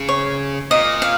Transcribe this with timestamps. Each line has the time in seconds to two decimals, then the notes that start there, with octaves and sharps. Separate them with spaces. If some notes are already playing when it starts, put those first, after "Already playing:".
Already playing: C#3
0.09 C#5
0.71 A#2 D#5
1.02 F5